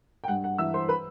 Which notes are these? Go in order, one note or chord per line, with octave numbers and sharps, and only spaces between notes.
G5
G2 F#5
F#5
E3 E5 E6
C5 C6
B4 B5